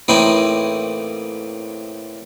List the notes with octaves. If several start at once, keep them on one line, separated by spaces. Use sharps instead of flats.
A2 E3 A#3 C4 D#4 E4